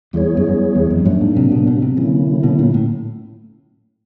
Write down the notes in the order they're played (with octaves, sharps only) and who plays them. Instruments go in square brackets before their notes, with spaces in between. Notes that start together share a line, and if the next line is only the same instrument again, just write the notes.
[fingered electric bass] E2 [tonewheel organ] G3 B3 E4 G#4 C#5
[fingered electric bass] F#2
F#2
E2
F2
G2
[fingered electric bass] F#2 [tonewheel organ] A2 F#3 A#3 D4
[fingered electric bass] G#2
C3
B2
B2
C3
[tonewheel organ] D3 F#3 A#3 C#4 E4
[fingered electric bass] B2
A#2
A2